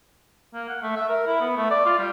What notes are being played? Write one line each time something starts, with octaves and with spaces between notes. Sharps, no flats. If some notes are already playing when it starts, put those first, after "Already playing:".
A#3
F#5
A3
E5
A#4
E4
B3
A3
D5
F4
G3